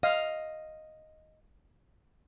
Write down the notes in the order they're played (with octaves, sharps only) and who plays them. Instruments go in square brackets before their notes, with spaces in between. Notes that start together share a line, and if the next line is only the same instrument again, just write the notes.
[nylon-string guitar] D#5 [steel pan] F5